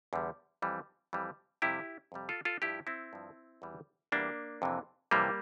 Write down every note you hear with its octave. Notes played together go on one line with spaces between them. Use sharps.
E2 D3 G3
F2 E3 G3
F2 E3 G3
F2 C3 G3 E4 G4
F2 C3 G3
F4 A4
F4 A4
G2 F3 E4 G4
C4 E4
G2 F3
E2 E3 G3
E2 E3 G3 A#3 D4
F2 C3 E3
F2 C3 E3 G3 A#3